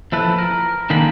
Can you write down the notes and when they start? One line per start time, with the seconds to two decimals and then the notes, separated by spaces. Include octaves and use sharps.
0.12 F3 E4 A4 B4
0.38 A#4
0.90 D3 D#3 G#3 A#3 B5